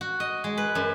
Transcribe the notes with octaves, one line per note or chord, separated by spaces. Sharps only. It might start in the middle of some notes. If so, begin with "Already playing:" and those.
F#4
D#5
G#3
B4
F#2